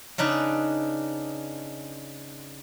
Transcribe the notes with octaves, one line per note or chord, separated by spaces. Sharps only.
C#3 D4 D#4 B4